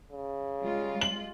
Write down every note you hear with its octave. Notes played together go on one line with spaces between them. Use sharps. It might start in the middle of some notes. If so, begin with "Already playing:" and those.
C#3
G3 G#3 F4
F#7